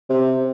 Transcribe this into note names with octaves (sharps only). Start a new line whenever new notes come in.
C3